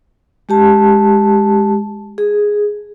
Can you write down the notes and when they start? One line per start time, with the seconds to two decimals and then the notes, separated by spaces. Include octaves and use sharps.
0.49 G#3 G4 A5
2.18 G#4